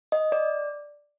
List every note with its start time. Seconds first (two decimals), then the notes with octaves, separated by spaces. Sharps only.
0.12 D#5
0.32 D5